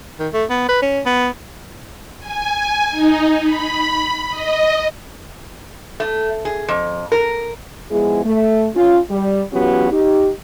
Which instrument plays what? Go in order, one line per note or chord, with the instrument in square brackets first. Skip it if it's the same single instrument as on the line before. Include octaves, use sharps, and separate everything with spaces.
[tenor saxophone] D#3
A3
B3
B4
C#4
B3
[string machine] G#5
D#4
B5
D#5
[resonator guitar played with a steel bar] A3
G#4
F2
A#4
[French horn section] F3 G#3 B3 E4 G#4
A3
C#4 F4
G3
E3 F#3 B3 C#4 F4 G4
D#4 G4